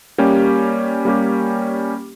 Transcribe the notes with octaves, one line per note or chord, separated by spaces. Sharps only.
G3 A#3 C#4 G4
G3 A#3 C#4 G4